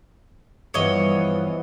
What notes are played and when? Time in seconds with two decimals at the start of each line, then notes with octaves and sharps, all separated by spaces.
0.74 G2 E3 F3 B3 C#5 D#5